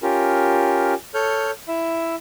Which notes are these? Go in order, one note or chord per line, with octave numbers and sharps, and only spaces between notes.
C#4 F4 G4 A#4
A4 C#5 F6 G6
E4 E5